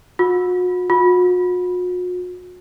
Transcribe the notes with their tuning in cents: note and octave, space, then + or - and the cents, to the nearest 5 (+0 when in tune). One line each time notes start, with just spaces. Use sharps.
F#4 -40
F#4 -45